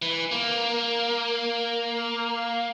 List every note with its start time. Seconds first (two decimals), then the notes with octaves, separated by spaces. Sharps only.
0.02 E3
0.32 A#3